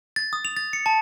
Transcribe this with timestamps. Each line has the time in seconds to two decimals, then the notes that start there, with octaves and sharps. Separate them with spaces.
0.16 A6
0.33 D#6
0.45 F7
0.57 A6
0.73 C#7
0.86 A5